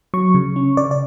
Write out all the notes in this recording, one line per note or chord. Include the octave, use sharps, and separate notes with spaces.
F#3 C#6
C#3
C#4
C#3 D5
D5